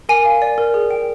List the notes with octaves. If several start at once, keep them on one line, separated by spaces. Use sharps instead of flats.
A#4 G#5
F5
D5
A#4
G#4
G5